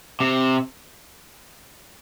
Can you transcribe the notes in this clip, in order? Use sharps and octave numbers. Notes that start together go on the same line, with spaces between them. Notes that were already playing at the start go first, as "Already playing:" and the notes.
C3